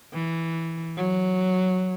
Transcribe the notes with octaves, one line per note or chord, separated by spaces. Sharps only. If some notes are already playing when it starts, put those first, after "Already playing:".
E3
F#3